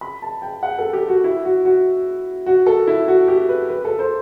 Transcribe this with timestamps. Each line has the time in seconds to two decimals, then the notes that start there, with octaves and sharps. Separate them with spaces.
0.01 B5
0.22 A5
0.42 G5
0.63 F#5
0.79 A4
0.93 G4
1.08 F#4
1.24 E4
1.45 F#4
1.65 F#4
2.46 F#4
2.66 A4
2.87 E4
3.08 F#4
3.28 G4
3.49 B4
3.69 B4
3.85 A4
3.99 C5